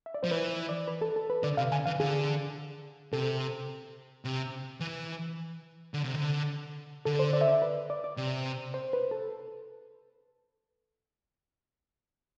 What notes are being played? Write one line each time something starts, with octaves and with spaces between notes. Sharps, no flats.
E5
D5
F3 C5
E3 B4
D5
B4
A4
A4
B4
D3 D5
C3 F5
D3 G#5
E3 F5
D3 G#4
C3 A4
C3
E3
D3
C3
D3
D3 A4
C5
D5
E5
D5
B4
D5
D5
C3
C5
B4
A4